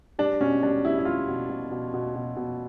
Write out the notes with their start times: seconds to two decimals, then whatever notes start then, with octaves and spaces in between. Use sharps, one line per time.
0.19 G3 D4
0.40 B2 C#4
0.63 G3 D4
0.84 G3 E4
0.98 E4
1.05 G3 F4
1.28 B2
1.49 B2
1.71 B2
1.94 B2
2.16 B2
2.36 B2